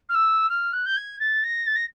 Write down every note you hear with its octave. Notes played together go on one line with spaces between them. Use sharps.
F6
E6
F6
F#6
G6
G#6
A6
A#6
A6
A#6